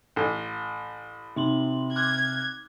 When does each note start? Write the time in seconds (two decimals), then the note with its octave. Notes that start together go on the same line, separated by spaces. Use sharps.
0.16 A1
1.36 C3 D#4 C6 F#7
1.96 D6 F6 F#6 G#6